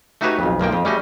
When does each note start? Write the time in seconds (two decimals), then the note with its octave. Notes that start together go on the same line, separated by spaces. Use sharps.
0.21 A3 D#4 F#4 G4 B4 C#5
0.39 B1 F2
0.59 B1 F3 A#3 G5
0.72 F2
0.85 G3 A3 C#4 F#4 G#4 D#5